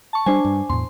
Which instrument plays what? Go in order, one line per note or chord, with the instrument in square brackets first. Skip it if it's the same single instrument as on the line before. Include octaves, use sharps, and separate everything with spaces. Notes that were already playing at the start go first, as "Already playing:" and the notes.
[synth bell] A5 C#6
[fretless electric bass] G3 [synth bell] D4 C5 G#5
[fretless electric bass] G2
[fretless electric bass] E2 A2 [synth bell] C6